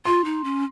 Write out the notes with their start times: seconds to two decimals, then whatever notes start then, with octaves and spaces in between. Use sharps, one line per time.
0.05 F4 C6
0.25 D#4
0.44 C#4